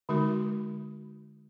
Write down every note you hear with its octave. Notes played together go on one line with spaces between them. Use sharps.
D3 G#3 D#4 F#4 A#4